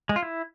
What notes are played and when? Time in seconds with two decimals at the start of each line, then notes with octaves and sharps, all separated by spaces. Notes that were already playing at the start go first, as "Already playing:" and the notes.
0.09 G#3
0.16 F4
0.23 E4